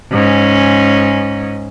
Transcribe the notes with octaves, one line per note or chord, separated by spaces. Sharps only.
G#2 C#4